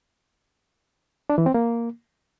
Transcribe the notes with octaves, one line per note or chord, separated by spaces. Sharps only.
D4
E3
C4
A#3